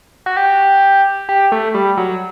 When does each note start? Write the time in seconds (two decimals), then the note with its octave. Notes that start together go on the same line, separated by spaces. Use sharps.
0.26 F#4
0.37 G4
1.29 G4
1.52 A3
1.74 G3
1.97 F#3